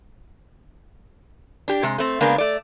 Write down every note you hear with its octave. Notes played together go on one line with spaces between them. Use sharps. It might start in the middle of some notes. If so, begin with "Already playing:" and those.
D4 G4
C3 G#3
A3 C4
C#3 G#3 A#3 B3 D4
A3 D5